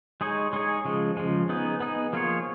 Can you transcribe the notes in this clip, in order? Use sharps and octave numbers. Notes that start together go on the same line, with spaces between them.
G#3 D#4 G#4 C#5
G#3 D#4 G#4 C#5
C#3 F3 G#3
C#3 F3 G#3
B3 D#4 G#4
B3 D#4 G#4
F3 A#3 F4 G#4 C#5